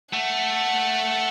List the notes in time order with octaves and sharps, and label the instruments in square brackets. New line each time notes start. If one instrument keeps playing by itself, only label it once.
[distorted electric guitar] A3 [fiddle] F#5